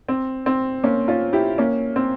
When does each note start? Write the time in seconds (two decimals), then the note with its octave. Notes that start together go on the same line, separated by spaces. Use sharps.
0.09 C4
0.46 C4
0.84 A#3 C#4
1.08 C#4 F4
1.33 E4 G4
1.58 A#3 C#4
1.96 C4